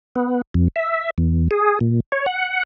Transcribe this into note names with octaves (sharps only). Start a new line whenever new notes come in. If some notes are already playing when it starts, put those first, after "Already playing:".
B3
F2
E5
E2
G#4
A#2
C#5
F#5